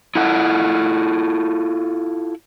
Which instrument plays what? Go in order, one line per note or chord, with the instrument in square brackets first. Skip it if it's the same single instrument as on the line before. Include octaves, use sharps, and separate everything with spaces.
[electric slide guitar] E4 F4 A4 F#5